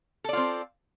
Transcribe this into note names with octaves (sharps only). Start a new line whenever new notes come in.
C4 F4 A4 D5